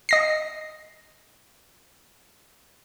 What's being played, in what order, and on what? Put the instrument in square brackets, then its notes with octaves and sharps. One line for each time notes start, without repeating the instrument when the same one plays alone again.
[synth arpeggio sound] D#5 A#6 C7